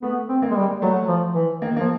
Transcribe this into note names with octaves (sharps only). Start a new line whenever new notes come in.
A3 B3
C4
A#3
G#3
G3
F#3 A3
F3
E3
D#3 A#3
A#3
F3